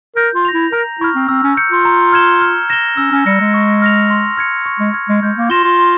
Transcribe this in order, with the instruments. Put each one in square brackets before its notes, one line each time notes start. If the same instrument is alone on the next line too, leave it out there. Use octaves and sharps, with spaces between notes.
[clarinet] A#4 [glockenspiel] G6
[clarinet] F4
[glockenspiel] A#6 F7
[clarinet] E4
[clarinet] A#4 [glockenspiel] A#5
[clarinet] E4 [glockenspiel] C#6 F6
[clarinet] C4
[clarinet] C4 [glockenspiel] E6
[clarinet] C#4
[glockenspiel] G6 C#7
[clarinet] F4
[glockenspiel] A#5
F6 G#6 E7 G7
F6
A#6 E7 G7
[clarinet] C#4 [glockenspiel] E6
[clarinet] C#4
[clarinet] G3 [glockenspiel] A#6 C#7
[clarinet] G#3
[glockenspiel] C#6
F6 A#6 F7
C6
F6 G#6 C#7
C#6
[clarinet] G#3
[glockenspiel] F6 G#6
[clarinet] G#3
[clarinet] G#3 [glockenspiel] G6
[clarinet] A#3
[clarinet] F4 [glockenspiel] A#6 E7 G7
[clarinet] F4
[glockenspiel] C6